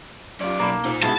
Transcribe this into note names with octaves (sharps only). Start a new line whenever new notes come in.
F#2 F4 G4 D5
B1 A#3 B5 E7
A#2 D#4 C5
G#2 B2 G#3 E4 F#4 F5 A5 G7